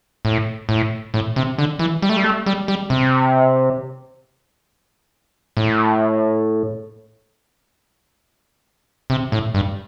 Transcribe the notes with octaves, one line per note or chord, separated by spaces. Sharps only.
A2
A2
A2
C3
D3
E3
G3
A3
G3
A3
G3
G3
C3
A2
C3
A2
G2